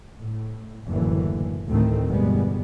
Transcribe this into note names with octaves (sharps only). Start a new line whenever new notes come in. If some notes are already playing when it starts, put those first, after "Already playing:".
A2
F#1 D#2 A2 D3 E3
A1 D2 A2 D#3 A3 C4
G1 E2 B2 G3 G#3 B3